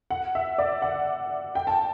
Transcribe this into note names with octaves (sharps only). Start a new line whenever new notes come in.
F#5
E5
D5
F#5
G5
A5